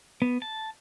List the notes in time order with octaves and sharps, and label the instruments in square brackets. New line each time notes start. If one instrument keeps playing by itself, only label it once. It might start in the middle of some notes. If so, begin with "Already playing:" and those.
[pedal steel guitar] B3
A5